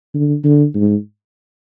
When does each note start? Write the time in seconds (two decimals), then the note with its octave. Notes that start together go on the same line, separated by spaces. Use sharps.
0.14 D3
0.44 D3
0.74 G#2